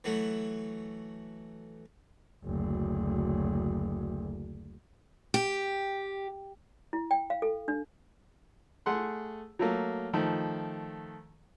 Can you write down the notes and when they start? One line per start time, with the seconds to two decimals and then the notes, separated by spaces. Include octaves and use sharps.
0.04 E3 F#3 A3
2.44 F#1 D2
5.34 G4
6.93 E4
7.11 G5
7.30 F5
7.42 A4
7.68 D4
8.86 A3 G#4 F#5 C6
9.59 F#3 A3 A#3
10.13 D#3 F3 A3